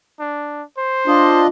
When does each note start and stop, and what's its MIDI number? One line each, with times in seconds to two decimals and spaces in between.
0.20 0.63 62
0.78 1.44 72
1.07 1.47 62
1.07 1.47 65
1.07 1.47 75